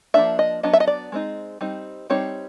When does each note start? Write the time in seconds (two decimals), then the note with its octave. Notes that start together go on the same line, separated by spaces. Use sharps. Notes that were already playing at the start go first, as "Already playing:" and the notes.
0.14 F3 A#3 D4 E5
0.39 D#5
0.63 F#3 B3 D4 D#5
0.73 E5
0.80 D#5
0.87 D5
1.12 G#3 C4 D#4
1.61 G3 C4 D#4
2.10 G3 C4 D#4 C#5